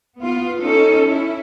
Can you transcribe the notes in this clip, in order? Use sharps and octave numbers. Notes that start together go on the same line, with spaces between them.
B3 F4
C#4 D#4 A4
E4